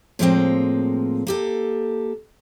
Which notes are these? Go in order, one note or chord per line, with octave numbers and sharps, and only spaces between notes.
A2 F3 G#3 A#3 C4 G5
A#3 G4 A4